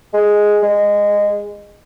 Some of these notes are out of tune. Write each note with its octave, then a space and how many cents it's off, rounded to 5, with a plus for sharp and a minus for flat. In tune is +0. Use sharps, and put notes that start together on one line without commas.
G#3 +0
G#3 -15